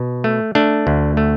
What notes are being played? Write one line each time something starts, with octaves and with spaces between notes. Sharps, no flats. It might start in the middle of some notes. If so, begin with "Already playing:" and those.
Already playing: B2
A3
A3 D4
D2
A3